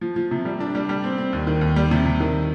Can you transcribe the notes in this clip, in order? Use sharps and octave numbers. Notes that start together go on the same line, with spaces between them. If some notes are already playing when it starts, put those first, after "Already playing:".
F3
F3
C3
G3
D4
G3
G3
C4
C4
D#2
D#3
D#2
G3
C3
C3
D#3